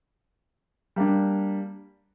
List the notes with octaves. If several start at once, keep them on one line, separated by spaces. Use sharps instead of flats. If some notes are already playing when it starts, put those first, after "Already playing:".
G3 A#3 D4